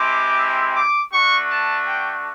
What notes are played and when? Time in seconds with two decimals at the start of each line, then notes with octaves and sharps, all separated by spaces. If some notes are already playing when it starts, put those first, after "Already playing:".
Already playing: G#3 C4 E4 G4 D6
0.75 D6
1.11 A3 D4 F#4 C#6
1.49 A5
1.86 G5